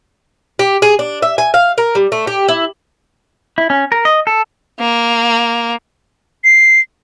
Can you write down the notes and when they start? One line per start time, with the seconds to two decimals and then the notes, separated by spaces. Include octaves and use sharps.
0.59 G4
0.82 G#4
0.99 D4
1.22 E5
1.38 G#5
1.54 F5
1.78 A#4
1.95 G3
2.12 A3
2.27 G4
2.48 E4
3.58 E4
3.70 C#4
3.92 A#4
4.05 D#5
4.27 A4
4.80 A#3
6.44 C7